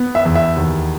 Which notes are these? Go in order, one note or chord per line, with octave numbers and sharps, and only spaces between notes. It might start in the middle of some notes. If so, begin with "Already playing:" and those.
Already playing: B3
E5
E2
E5
D#2